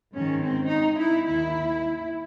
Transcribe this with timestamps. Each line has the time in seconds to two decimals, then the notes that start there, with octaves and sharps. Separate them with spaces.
0.15 G#2 D#3 C#4
0.42 C4
0.70 D#4
0.99 E4
1.27 D#2 D#3 E4